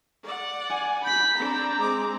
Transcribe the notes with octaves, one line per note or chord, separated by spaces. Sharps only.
D5 F#5
G#5
B5 G6 B6
C4 D4 A#5
G#3 C4 D6